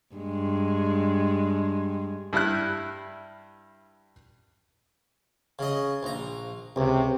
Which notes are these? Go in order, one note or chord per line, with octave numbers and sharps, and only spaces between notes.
G2 G#3
G2 E4 E5 F6 F#6
C#3 D#5
A#1 A#5
C#2 C3